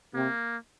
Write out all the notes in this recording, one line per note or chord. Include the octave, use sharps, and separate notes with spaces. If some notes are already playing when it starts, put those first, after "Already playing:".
C3 A#3